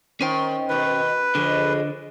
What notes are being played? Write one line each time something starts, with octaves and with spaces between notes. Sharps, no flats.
D#3 C#4 C5 G5
B2 D#3 B4
F2 D3 G#3